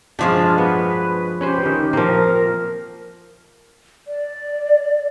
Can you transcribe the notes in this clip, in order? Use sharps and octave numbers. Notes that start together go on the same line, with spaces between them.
G2 B2 F3 G#3 D4 F4
B3 B4
C#4 G4 B4 C5
D#3 C#4
A#2 F3 A#3 C4 A#4
D5